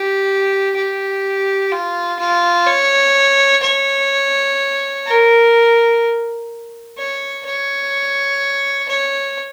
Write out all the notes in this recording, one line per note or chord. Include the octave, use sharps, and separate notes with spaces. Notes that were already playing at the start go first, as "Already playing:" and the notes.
Already playing: G4
G4
F4
F4
C#5
C#5
A#4
C#5
C#5
C#5